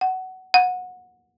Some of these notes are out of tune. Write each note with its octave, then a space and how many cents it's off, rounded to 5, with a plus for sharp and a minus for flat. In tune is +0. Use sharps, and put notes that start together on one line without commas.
F#5 +15
F#5 -20